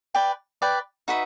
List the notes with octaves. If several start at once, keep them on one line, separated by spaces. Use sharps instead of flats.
B4 D5 G5
B4 D5 G5
D#4 F#4 B4 E5